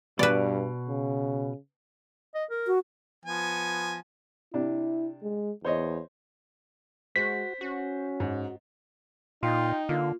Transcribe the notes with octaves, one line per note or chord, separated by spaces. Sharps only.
G2 B2 B4 D5
C#3
D#5
A#4
F#4
F3 B3 G#5
C3 D4 E4
G#3
E2 C5 C#5 D#5
G#3 F#4 C5 B6
C#4 F#4
G#2
A#2 D#4 F4 G5
D3 A#3 F4